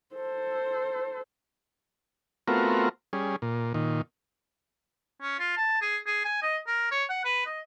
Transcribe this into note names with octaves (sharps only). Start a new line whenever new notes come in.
A4 C5
A3 B3 C4 F4 F#4 A#4
G3 C#4 G#4
A#2
A#2 D#3
C#4
F4
A5
G#4
G#4
G#5
D#5
A#4
C#5
F#5
B4
D#5